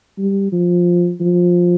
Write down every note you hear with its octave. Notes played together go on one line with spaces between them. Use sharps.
G3
F3
F3